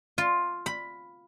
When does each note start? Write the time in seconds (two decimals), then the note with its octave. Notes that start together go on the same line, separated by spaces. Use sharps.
0.18 F4
0.66 B5